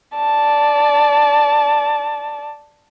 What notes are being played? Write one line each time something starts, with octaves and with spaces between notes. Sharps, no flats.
D5 A5